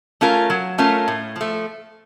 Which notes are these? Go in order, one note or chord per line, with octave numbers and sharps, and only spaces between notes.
A3 C#4 F4 A#4
F#3
A3 C#4 F4 A#4
A2
F3 A3